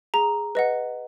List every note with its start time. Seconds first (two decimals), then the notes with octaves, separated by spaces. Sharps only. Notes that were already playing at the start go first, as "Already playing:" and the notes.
0.14 G#4 A#5
0.55 B4 D#5 F#5